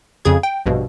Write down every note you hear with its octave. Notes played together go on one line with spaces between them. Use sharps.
F2 C#3 G#4 G#6
G5
A#1 G2 B2